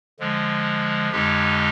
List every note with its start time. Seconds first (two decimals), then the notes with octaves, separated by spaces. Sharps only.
0.19 D3 F3 G#3
1.12 F2 D3 G#3 D#4 G4